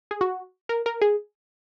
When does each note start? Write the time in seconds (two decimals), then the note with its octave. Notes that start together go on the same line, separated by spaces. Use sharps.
0.11 G#4
0.21 F#4
0.69 A#4
0.86 A#4
1.01 G#4